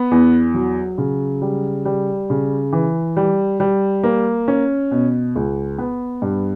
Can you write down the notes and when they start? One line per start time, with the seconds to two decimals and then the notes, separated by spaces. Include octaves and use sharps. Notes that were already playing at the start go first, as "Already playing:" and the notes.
Already playing: B3
0.11 E2
0.54 F#3
0.98 C#3
1.42 G3
1.85 G3
2.30 C#3
2.72 E3
3.17 G3
3.60 G3
4.03 A#3
4.48 C#4
4.91 B2
5.36 C#2
5.78 B3
6.22 G2